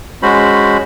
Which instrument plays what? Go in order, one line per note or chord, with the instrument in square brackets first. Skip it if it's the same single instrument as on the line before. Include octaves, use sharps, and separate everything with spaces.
[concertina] G#3 C#4 F#4 C5 B5